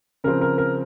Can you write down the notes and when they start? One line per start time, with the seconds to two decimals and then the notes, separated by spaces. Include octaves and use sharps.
0.24 C#3 F3 C4 A#4
0.41 A#4
0.58 A#4